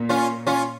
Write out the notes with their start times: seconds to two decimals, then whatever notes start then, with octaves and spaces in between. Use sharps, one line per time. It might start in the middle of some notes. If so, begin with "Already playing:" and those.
Already playing: A#2
0.09 C#4 F4
0.47 C#4 F4